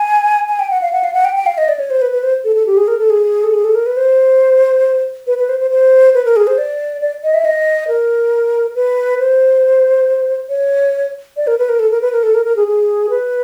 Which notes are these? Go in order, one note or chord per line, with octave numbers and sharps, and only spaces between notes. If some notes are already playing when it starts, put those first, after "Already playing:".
Already playing: G#5
G#5
G5
F#5
F5
F#5
F5
F#5
G5
G5
F5
D#5
D5
C#5
C5
B4
B4
C5
A4
A4
G4
G#4
A#4
A4
G#4
A4
G#4
A4
A#4
B4
C5
B4
B4
C5
C5
C5
B4
A#4
G#4
C5
D5
D5
D#5
E5
D#5
A#4
B4
C5
C#5
D5
A#4
B4
A#4
A4
A#4
B4
A#4
A4
A#4
A#4
G#4
G#4
B4